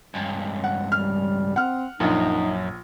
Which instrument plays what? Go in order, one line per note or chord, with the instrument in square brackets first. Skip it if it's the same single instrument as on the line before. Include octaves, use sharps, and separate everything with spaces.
[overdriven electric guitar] C#2 G2
[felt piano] F#5
[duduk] G3 [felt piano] F6
[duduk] C4 [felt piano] F#5 F6
[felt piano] A#1 [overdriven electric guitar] F#2 [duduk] D#4